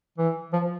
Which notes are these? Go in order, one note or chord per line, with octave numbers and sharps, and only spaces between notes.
E3
F3